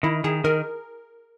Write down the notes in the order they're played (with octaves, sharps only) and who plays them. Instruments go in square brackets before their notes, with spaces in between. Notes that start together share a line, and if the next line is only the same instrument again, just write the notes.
[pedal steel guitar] D#3 [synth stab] E4
[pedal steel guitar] D#3 [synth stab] G#4
[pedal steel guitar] D#3 [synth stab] A#4